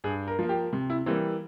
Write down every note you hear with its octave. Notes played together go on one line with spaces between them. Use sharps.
G2 G#4
A#4
F3 A#3
G4
C3
E4
E3 G3 A#3 C4